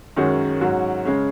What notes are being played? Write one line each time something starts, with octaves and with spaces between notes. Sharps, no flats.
F#2 D#3 G#3 C#4 F#4
G#2 F#3 C#4 F#4
C#3 G#3 C#4